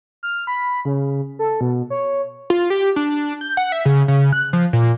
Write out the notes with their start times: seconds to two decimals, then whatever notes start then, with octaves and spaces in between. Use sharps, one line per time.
0.23 F6
0.47 B5
0.85 C#3
1.39 A4
1.61 B2
1.90 C#5
2.50 F4
2.70 G4
2.96 D4
3.41 G6
3.57 F#5
3.72 E5
3.85 C#3
4.08 C#3
4.32 F#6
4.53 F3
4.73 A#2